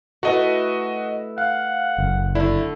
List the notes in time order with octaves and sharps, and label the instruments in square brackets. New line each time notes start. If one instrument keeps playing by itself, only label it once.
[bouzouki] A3 E4 B4 [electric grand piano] F#4 D#5
[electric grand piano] F5 [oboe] F#5
[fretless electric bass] F#1
[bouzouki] D3 A3 [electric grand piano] E4